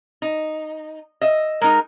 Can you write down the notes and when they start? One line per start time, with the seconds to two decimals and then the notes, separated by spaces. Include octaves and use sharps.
0.22 D#4
1.21 D#5 E5
1.61 G#3 D#4 A#4